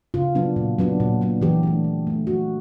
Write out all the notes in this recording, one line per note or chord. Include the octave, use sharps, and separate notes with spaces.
C#3 F4
F#3 B3 D4
A#2
F#3 B3 D4
A#2
F#3 B3 D4
E3 G4
A3 D4
E3
A3 D4
F3 F#4